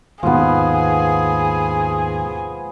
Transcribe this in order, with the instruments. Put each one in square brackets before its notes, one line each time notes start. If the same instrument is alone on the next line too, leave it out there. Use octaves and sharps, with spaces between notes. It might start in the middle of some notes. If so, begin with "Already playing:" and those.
[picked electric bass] D#2 G#2 B2 [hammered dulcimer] F3 B3 [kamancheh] G#4